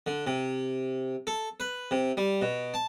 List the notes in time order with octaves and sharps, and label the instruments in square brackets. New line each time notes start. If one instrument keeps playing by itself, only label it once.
[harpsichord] D3
C3
A4
B4
C3
G3
B2
A5